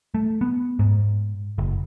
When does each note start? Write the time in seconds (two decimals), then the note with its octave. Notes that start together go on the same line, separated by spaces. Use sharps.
0.14 A3
0.41 B3
0.79 G#2
1.58 F#1